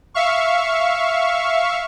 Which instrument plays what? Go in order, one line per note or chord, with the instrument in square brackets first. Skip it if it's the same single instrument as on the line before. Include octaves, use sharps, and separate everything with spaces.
[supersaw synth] E5 F5 C#6